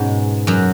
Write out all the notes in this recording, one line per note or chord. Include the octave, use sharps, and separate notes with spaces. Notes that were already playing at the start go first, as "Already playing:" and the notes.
Already playing: G#2 B2 G#3 B3 C#4
F#2 F#3